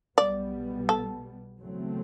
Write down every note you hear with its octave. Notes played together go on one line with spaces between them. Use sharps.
B1 B2 G3 B3 D5
A4
E2 C#3 F#3 A3 C4